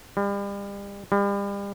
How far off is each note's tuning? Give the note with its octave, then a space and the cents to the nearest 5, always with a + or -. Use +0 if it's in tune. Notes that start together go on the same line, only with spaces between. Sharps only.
G3 +35
G3 +35